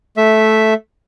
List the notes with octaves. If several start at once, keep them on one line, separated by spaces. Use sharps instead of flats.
A3 E5